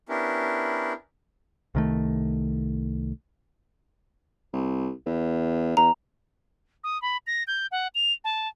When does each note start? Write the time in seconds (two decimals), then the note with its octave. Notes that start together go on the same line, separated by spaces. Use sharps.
0.09 B3 C#4 D4 E4 G4 A#4
1.75 C2 D#3 A3
4.53 C2
5.06 E2
5.77 E2 A#5
6.84 D#6
7.02 B5
7.27 A#6
7.47 G6
7.72 F#5
7.95 F7
8.24 A5